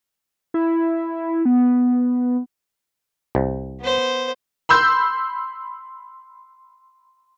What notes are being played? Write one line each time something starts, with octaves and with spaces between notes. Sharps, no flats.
E4
B3
C2
B3 C5
B5 C6 E6 G6